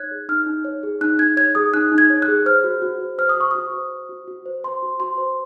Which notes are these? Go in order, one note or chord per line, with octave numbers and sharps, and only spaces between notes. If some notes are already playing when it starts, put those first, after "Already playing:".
Already playing: D#4 C#5 F#6 G#6
G#4
D#4 F6
D#4
C#5
G#4
D#4 F#6
D#4 G#6
C#5 G#6
G#4 D#6
D#4 F#6
D#4
G#6
C#5
F#6
G#4
C5 F6
F#4
F#4
C5
C5 F6
D#6
F#4 C#6
F#4 D#6
C5
C5
F#4
F#4
C5
C5 C6
F#4
F#4 C6
C5